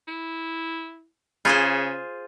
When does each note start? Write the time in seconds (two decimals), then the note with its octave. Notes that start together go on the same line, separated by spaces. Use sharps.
0.08 E4
1.45 C#3 F4 G#4 C5